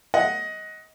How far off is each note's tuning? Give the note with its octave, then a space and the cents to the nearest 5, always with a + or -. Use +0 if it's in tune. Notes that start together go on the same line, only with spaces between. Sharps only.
D#5 +15 F#5 +0